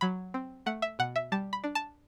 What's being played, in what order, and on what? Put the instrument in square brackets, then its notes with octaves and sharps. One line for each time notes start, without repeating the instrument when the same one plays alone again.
[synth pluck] F#3 B5
C4
A3 F#5
E5
B2 F#5
E5
G3 A5
B5
D4
A5